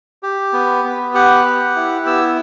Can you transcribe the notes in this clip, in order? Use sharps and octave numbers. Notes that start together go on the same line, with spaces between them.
G4
B3
B3
G4 F#5
G4
E4
B3 E6